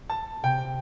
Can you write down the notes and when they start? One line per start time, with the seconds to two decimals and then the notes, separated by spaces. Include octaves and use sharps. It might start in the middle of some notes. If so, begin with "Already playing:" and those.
0.10 A5
0.43 C3 G5